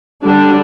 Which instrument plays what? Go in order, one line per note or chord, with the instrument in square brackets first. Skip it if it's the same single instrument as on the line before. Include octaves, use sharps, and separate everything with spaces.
[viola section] D3 G3 D4